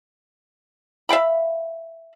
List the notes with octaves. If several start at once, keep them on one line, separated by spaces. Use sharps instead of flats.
E5 F5 G5 B5